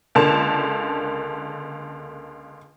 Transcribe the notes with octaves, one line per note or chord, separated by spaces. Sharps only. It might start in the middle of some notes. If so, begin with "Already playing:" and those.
C#2 D3 A#3 A5